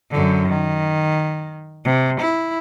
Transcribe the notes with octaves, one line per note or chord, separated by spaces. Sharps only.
F#2 D3
D#3
C3
E4